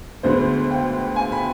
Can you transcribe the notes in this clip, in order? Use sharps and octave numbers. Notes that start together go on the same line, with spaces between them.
D2 D3 G#3 B3 C5
G5
G#5
B5